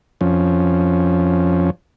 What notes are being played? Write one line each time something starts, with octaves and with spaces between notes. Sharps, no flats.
F2 F3 C#4